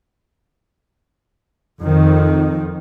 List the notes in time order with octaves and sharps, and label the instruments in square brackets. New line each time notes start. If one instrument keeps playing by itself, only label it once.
[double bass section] F2 D#3